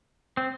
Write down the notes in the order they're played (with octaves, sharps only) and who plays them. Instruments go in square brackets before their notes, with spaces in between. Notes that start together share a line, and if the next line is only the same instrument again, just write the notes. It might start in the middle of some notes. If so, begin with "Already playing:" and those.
[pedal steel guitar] C4